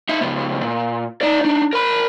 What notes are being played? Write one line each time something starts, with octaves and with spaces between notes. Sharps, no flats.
D#4 E5
C#2 B3
A#2
D#4 D5
D4 D#4
A#4 B5